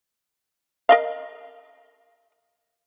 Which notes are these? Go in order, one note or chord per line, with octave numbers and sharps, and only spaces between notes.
A#4 D#5 F5